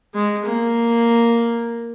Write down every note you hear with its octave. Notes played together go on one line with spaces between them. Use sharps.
G#3
A#3